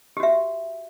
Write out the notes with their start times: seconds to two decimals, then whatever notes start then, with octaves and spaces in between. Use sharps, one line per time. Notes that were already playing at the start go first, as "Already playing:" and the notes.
0.17 G4
0.20 F#4
0.23 E5